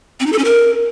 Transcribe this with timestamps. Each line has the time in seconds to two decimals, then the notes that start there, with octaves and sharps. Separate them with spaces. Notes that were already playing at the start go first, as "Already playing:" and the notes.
0.20 C4
0.26 D#4
0.32 A4
0.39 C#4
0.45 A#4